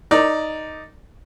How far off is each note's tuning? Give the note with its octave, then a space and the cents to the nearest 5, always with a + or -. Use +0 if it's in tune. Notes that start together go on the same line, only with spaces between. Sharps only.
D#4 +0 A#4 -30 D5 +0